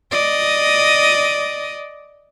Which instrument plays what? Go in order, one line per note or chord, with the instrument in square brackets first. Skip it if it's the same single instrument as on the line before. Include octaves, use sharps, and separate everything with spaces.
[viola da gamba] D5 D#5